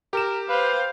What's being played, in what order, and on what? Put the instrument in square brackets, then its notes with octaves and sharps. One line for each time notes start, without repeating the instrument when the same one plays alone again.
[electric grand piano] G4 E7 [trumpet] A#4
[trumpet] B4 [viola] C5 F5